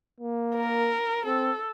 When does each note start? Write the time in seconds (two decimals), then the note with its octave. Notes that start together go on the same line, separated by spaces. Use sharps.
0.20 A#3
0.56 A#4
1.26 C4 A4